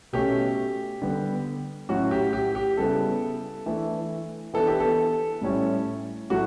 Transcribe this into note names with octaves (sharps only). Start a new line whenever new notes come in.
B2 A3 C#4 G4
D3 G3 B3
A2 F#3 C#4 E4 F#4
G4
G4
G4
C#3 G3 B3 E4 A4
E3 A3 D4
E3 B3 D4 A4
G4
A4
A2 G3 C#4 E4
A2 F#3 A3 E4 F#4